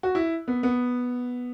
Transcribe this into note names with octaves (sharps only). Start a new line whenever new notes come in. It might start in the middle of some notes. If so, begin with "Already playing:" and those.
F#4
E4
B3
B3